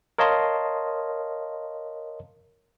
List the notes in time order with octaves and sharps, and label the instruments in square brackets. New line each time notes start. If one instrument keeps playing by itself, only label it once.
[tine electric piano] A#4 C#5 D#5 F5 A5 C6